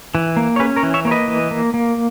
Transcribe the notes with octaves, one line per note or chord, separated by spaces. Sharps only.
E3
A#3
C#5
C#4 G#4 B4
A#4 C#5
E3
C#5 E5
A#3 C#5
B4 D#5
E3
A#3
A#3